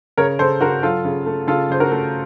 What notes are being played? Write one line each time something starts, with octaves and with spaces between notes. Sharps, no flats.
C#3 A#4 C#5
C#3 A4 C5
C#3 F#4 A#4
F#3 F4 A4
C#3
A3
C#3 F4 A4
C#3 C5
F#4 A#4
A3